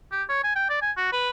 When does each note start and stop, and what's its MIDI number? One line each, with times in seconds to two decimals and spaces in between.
0.12 0.23 67
0.29 0.43 73
0.44 0.52 80
0.56 0.67 79
0.70 0.82 74
0.82 0.91 80
0.97 1.08 66
1.13 1.30 71